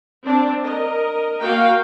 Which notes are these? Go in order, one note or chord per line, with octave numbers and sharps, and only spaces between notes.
C4 D4
A#4 D#5
A#3 F#4 F5 G5